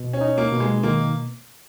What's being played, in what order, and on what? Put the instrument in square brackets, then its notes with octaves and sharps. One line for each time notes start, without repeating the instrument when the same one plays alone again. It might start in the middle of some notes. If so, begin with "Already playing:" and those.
Already playing: [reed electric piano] B2
[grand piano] C#4
[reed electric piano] D#4
[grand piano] A#3
[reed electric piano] B2
[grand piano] G#3
[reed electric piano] D#3 [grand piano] A#3